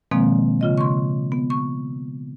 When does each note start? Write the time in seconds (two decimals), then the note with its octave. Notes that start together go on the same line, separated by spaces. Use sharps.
0.11 B2 D#3 F3 G#3 A#3 C4
0.61 C#3 F4 D#5
0.78 C6 C#6
1.32 B3
1.50 C#6